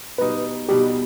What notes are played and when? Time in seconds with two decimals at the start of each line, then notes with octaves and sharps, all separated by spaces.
0.18 B2 G3 D#4 B4
0.69 B2 G3 D#4 G4